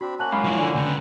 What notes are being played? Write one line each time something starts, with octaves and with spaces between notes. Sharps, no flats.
C4 D4 F#4 B5
A#3 C#4 F#4 A5 F#6 F#7
F#2 G#3 F5 B5
F3 E4
D3 D5 G#5
D2 C#3 B4 G5 A#5